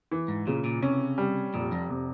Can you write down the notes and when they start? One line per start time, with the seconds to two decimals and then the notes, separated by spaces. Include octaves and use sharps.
0.12 E3
0.28 G#2
0.47 A#2 C#3
0.64 A#2
0.82 C3 C#4
1.18 G3
1.54 F1 A#2
1.72 F2
1.90 C3